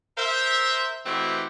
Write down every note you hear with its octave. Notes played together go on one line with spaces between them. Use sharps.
A#4 C5 E5
B2 E3 A3 C4 E4 G4